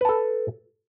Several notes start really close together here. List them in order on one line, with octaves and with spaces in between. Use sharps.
B4 A5 A4